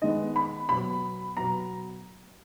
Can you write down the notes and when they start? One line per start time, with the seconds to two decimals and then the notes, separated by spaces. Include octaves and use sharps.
0.02 D#3 G#3 B3 D#5
0.36 B5
0.69 B2 F#3 B3 B5
1.37 B2 F#3 B3 A#5